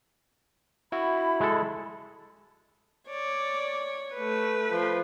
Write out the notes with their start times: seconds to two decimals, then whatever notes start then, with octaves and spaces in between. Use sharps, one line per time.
0.92 E4 F#4 B5
1.40 G#3 A4
3.10 C#5 D5
4.14 A3 B4
4.71 F3